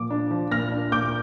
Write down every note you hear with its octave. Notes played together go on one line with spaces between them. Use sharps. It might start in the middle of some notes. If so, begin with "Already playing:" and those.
Already playing: A#2 F3 D6
D4
F3
A#2 F6 A#6
D4
A#2 D6 G6